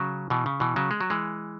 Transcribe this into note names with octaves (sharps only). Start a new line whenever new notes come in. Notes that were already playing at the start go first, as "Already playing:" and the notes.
Already playing: C#3 F#3
B2 E3
C#3
B2 E3
C#3 F#3
G#3
F#3
E3 G#3